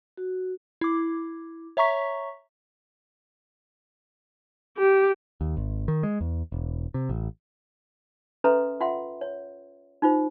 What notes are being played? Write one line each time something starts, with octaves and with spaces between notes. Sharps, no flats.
F#4
E4 D6
C#5 E5 A#5 C#6 B6
G4
D#2
G#1
D#3
G#3
E2
E1
C3
A1
C#4 A4 B4 E5 A#5 C6
F4 E5 F#5 G5 C6
C#5
D#4 F4 C5